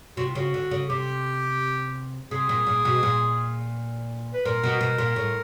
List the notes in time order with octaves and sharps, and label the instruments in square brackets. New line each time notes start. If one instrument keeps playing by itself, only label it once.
[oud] C3 [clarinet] F#4
[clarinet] F4
[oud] C#3 [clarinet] F#4
[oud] D3
C#3
[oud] C3 [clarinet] G4
[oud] C3 [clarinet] G#4
[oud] A#2
A#2
B2
A#2
[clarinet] B4
[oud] A#2 [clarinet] A#4
[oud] B2
B2
A#2
A2